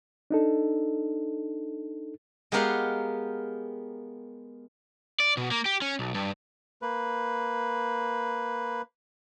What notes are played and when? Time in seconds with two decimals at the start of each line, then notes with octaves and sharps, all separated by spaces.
0.31 D4 D#4 A4
2.52 G#3 B3 G4 A#4 F5 F#5
5.20 D5
5.37 B2
5.51 A#3
5.66 G4
5.82 C#4
5.99 B1
6.14 G2
6.82 A#3 B4